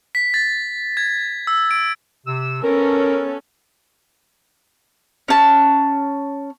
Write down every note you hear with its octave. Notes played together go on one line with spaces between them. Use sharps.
B6
A6
G#6
E6
D7
C3 E6
B3 C#4 A4 A#4
C#4 A5